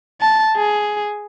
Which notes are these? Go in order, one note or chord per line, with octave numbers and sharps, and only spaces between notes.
A5
G#4